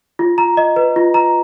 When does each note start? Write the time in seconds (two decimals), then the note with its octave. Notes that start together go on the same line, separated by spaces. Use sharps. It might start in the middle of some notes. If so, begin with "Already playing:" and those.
0.19 F4
0.38 A#5
0.57 D#5
0.76 B4
0.96 F4
1.14 A#5